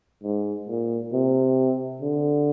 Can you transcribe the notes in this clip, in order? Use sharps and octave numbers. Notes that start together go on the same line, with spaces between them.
G#2
A#2
C3
D3